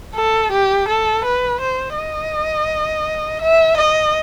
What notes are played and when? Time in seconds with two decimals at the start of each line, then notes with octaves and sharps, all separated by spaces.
0.15 A4
0.52 G4
0.88 A4
1.24 B4
1.61 C5
1.96 D#5
3.41 E5
3.77 D#5